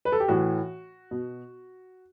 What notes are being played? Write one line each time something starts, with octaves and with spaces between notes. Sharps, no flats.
B4
A4
G4
A2 E3 F#4
B2